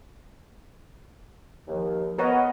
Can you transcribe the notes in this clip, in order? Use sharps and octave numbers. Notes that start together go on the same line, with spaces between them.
D#2 F3
B3 A#4 B4 C#5 D#5 F#5